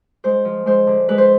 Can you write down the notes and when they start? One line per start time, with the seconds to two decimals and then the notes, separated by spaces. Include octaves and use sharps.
0.24 G#3 C5
0.45 F3
0.66 G#3 C5
0.87 D3
1.09 G#3 B4
1.18 C5